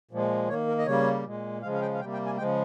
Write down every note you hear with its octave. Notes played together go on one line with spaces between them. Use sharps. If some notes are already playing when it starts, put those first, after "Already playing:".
A#2 F3 G#3
D#3 A#3 C#5
A#4
D#5
C#3 G3 A#3 C#5
A#2 G#3
C#3 F3 G#3 F5
F5
G5
F5
C3 G3 A#3 G5
G5
G#5
C#3 F3 G#3 G5